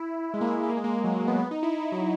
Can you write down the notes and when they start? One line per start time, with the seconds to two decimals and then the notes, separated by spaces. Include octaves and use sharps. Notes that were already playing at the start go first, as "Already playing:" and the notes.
Already playing: E4
0.34 G#3
0.41 A#3
0.48 G#3
0.55 A#3
0.63 G#3
0.69 A#3
0.77 G#3
0.84 A#3
0.92 G#3
1.04 F#3
1.16 G#3
1.27 B3
1.40 B3
1.51 D#4
1.63 E4
1.92 F#3